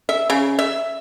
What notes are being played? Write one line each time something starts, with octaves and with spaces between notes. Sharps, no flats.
E5
C#3
E5